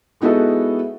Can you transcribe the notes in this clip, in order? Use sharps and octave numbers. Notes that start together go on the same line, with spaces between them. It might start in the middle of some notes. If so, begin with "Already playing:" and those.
G#3 B3 D#4 E4 F#4 A4